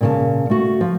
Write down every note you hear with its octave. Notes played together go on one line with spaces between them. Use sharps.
A#2 C#3 A5
A3 F#4
F3